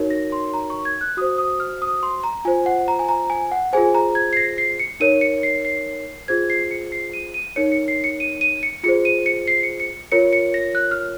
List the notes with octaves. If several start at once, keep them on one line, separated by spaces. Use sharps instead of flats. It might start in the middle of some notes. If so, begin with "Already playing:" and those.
Already playing: D#4 F#4 A#4 C#5
A#6
C6
A#5
C#6
G#6
F#6
F#4 C5 D#6
D#6
F6
D#6
C6
A#5
F4 C5 G#5
F#5
A#5
G#5
A#5
G#5
F#5
F4 G#4 C5 G#5
A#5
G#6
C7
A#6
C7
C#7
D#4 A#4 C#5 D#7
C#7
C7
C7
F4 G#4 C5 G#6
C7
C#7
C7
D#7
D#7
D#4 A#4 C#5 C#7
C#7
C7
C#7
D#7
D#7
C#7
F4 G#4 C5 C#7
D#7
C#7
C7
C#7
C#7
F4 A#4 C#5 C#7
C#7
A#6
F#6
F6